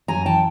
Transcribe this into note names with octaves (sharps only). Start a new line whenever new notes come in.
F#2 G#5 A#5
E3 G5 A5